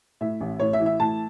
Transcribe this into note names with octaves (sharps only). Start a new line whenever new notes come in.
A2 E5
A1
A2 C#5
E5
E3
E5
A2 A5